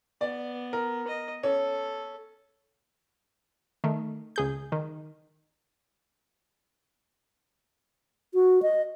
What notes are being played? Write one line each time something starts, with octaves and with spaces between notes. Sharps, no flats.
B3 D5
A#4
D#5
C#4 A4
D#3 A3
C#2 G#4 G6
D#3
F#4
D#5